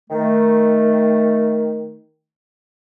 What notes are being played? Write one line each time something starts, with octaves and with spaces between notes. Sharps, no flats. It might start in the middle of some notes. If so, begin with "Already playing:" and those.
D#3 A3